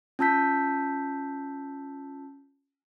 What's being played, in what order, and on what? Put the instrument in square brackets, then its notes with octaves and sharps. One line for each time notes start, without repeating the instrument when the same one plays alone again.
[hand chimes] C#4 F4 A5 E6 G6 B6